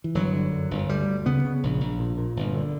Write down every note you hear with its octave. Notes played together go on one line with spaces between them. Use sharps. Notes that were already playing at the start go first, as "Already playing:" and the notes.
E3
G1 F#3
D3
F#2
G1
D2 G3
D2
C#3 B3
C#3
A#1
A#1
A#2
A#2
G1
D3